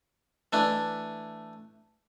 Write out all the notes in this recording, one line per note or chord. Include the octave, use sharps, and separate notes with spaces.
E3 A3 D4 E4